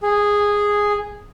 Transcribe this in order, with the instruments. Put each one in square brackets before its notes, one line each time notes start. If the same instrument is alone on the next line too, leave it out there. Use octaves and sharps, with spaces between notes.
[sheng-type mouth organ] G#4